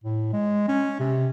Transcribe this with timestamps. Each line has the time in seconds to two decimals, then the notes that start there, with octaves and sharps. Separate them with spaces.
0.04 A2
0.33 G#3
0.68 C#4
0.99 C3